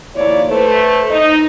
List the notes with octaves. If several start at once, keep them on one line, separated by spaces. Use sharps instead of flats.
D#2 F3 A#3 E4 C#5 D5
A3 B4 C5
D#4